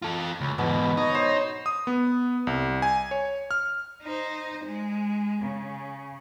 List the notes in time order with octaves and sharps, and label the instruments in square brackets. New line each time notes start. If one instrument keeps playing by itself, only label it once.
[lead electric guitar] F4 A4
C#2
[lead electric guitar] E2 G#2 [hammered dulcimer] B2
[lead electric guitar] D#4 [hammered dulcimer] C#5
[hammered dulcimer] C5
[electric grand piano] D#6
B3
C2
G#5
C#5
F6
[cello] D#4 C5
G#3
C#3